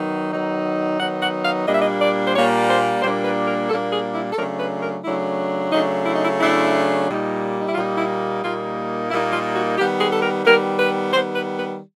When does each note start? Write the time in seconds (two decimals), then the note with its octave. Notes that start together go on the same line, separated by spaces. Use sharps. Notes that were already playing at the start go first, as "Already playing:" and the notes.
Already playing: D#3 F#3 B3 D#4
0.32 D#3 F#3 B3 D#4
0.99 D#3 F#3 B3 D#4 F#5
1.22 F#5
1.45 F5
1.67 A#2 G3 A#3 D4 D#5
1.74 E5
1.82 D#5
2.01 D5
2.27 C5
2.34 A#2 G3 A#3 D4 C#5
2.69 C5
3.02 A#2 G3 A#3 D4 C5
3.24 B4
3.47 A#4
3.69 A#2 G3 A#3 D4 A4
3.92 G#4
4.14 E4
4.33 A4
4.37 C#3 F#3 A3 D4 A#4
4.60 B4
4.82 A#4
5.04 C#3 F#3 A3 D4 E4
5.72 C#3 F#3 A3 D4 D#4
6.06 E4
6.15 D#4
6.24 E4
6.40 C#3 F#3 A3 D4 E4
7.08 A#2 G3 A#3 D#4
7.60 D#4
7.67 E4
7.75 A#2 G3 A#3 D#4 F4
7.98 E4
8.42 A#2 G3 A#3 D#4 F4
9.10 A#2 G3 A#3 D#4 E4
9.33 F4
9.55 F#4
9.77 D#3 G3 B3 G4
10.01 G#4
10.12 A4
10.22 A#4
10.45 D#3 G3 B3 A#4
10.79 B4
11.13 D#3 G3 B3 C5
11.35 B4
11.58 B4